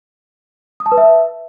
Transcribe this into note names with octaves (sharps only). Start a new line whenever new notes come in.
D#6
A5
B4
E5